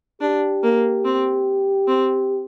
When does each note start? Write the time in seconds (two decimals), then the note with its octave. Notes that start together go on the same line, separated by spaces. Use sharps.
0.21 D4 G4
0.63 A#3
1.05 C4
1.88 C4